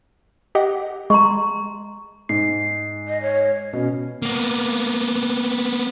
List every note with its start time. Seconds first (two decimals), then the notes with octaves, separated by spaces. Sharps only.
0.55 G4 D#5 F#5
1.10 G#3 A#5 C6 C#6
2.29 G#2 C7
3.08 D#5
3.22 C#5
3.73 B2 C#4
4.22 A#3 B3